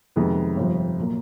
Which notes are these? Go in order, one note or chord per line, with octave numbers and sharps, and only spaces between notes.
F2 C3 D#3 G#3 B3
G1 F2 C3 F3
A#2 F#3 A#3